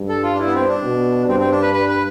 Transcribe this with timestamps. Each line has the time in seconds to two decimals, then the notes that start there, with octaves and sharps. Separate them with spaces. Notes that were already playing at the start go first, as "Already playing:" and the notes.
Already playing: G2
0.09 A4
0.23 F4
0.33 D4
0.39 E4
0.47 B3
0.54 C4
0.68 D4
0.83 B2
1.28 G2 C4
1.40 C4
1.51 D4
1.62 B4
1.74 B4
1.89 B4